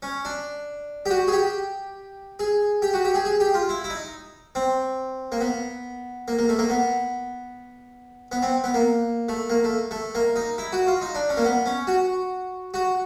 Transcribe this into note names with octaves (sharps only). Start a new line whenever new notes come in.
C#4
D4
G4
F#4
G#4
G4
G#4
G4
F#4
G4
G#4
G#4
G4
F4
E4
E4
D#4
C4
A#3
B3
A#3
A#3
A3
A#3
B3
B3
C4
B3
A#3
A3
A#3
A3
A3
A#3
D#4
E4
F#4
F4
D#4
D4
C#4
A#3
B3
C#4
F#4
F#4